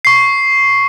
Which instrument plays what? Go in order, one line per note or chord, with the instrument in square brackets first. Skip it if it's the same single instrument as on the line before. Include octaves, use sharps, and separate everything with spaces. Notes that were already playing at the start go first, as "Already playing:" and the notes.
[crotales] C#6 C7